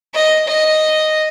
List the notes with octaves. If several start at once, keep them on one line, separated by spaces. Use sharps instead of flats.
D#5
D#5